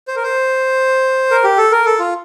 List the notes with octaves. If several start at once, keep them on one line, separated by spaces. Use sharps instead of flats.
C5
A#4
C5
A#4
G4
A4
A#4
A4
F4